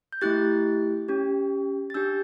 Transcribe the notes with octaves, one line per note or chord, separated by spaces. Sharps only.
G6
A3 E4 G4 F#6 A6
C#4 G4
A6
D4 G4 E6 G6